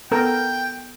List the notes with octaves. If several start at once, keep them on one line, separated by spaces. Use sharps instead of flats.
B3 A4 A#4 G5